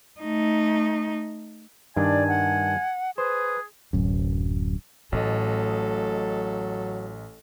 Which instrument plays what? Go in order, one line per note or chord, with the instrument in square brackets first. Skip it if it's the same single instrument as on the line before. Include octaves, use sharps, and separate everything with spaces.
[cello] A3 D#4
[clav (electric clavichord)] G2 D#3 D4 [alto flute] D5 [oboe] G#5
[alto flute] F#5
[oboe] G#4 [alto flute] B4 [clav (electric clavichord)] C5
[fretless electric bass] D1 F#2
[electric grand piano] A1 D#5 [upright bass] A2 [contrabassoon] F#3 [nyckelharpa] A4